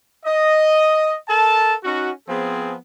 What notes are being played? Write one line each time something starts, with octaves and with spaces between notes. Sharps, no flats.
D#5
A4 A#4 A5
C#4 D#4 F#4
F3 B3 C4 G#4